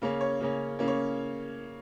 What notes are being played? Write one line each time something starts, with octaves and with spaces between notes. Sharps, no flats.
C#3 A#3 C#4
C#5
C#3 A#3 C#4
C#3 A#3 C#4
C#5